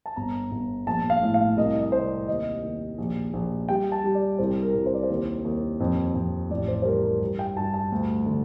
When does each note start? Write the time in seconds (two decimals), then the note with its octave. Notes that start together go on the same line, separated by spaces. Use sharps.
0.06 A5
0.16 G1 A#5
0.51 G1
0.86 A#1 A5
1.10 F5
1.22 A2
1.34 F5
1.57 C2 D#5
1.81 D#5
1.92 C3 C5
2.04 D5
2.27 D#2 D#5
2.63 D#2
2.98 A#1
3.33 A#1
3.69 G3 G5
3.92 A5
4.04 G3
4.15 D5
4.38 C2 C5
4.63 A#4
4.75 C2
4.86 C5
4.94 D5
5.03 C5
5.10 D#2
5.44 D#2
5.80 F2
6.15 F2
6.50 A1 D5
6.68 C5
6.82 C5
6.85 G3 A#4
7.04 A#4
7.22 G2
7.39 G5
7.56 G2 A5
7.74 A5
7.92 D2
8.26 D3